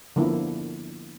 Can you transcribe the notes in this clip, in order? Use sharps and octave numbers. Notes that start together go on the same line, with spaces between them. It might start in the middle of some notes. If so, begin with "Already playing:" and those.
D3 F3 A#3 B3 E4